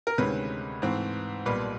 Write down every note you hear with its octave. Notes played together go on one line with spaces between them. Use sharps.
A#4
D2 C3 D#3 G#3 C#4 B4
G#2 E3 A3 C4
B1 A#2 G3 B4